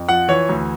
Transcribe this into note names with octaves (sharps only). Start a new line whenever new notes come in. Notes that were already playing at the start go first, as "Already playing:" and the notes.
Already playing: F2
F3 F#5
E3 C#5
D2